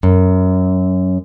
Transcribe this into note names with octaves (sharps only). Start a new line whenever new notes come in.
F#2